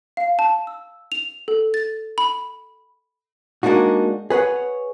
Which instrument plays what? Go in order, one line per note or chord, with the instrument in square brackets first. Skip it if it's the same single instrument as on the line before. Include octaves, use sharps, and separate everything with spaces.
[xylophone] F5
A5
E6
F7
A4
A6
B5
[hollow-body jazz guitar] G#3 A#3 D4 D#4 F#4
G#4 B4 C#5 F#5